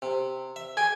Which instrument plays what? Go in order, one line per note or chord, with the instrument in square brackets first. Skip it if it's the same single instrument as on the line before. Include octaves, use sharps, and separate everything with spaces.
[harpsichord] C3
E5
[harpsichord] G#4 G5 [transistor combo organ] G#5